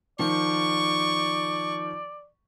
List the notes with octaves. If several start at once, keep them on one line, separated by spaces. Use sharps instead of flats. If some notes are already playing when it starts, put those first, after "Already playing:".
D#3 F3 D5 C#6